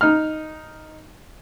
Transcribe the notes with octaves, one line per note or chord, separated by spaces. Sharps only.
D#4 F6